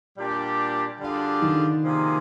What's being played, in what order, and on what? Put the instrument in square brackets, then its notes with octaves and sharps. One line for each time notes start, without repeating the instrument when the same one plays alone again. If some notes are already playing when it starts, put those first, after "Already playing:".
[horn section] A#2 G3 D4 G4
D3 G3 D4 F4 G#4
[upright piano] D#3
[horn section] C3 F3 A#3 D#4 G#4